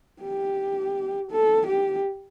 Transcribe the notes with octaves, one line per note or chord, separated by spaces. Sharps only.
G4
A4
G4